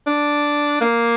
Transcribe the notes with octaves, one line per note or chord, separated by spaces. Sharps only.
D4
A#3